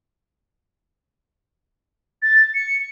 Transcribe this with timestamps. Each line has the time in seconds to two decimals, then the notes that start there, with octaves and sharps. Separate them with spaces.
2.22 A6
2.55 C#7